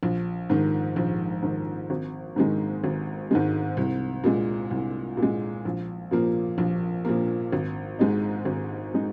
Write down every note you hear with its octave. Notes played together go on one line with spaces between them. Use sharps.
A#1
G#2 D#3
A#1
G#2 D#3
G#1
G#2 D#3 G#3
G#1
G#2 D#3 G#3
C2
A#2 G#3
C2
A#2
G#3
A#1
A#2 F3 A#3
A#1
A#2 F3 A#3
G#1
G#2 G#3 D#4
G#1
G#3 D#4